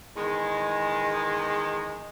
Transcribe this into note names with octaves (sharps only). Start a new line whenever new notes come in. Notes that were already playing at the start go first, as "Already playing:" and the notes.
E2 D#3 G#3